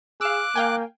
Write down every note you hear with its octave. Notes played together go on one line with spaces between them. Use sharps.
G#4 F5 D6 E6 F#6
A#3 F5 G5 G#5